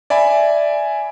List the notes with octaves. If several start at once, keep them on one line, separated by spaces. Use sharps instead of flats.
D5 E5 G#5 B5